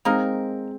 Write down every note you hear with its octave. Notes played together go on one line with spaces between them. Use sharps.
G#3 A#3 C4 D#4 A#4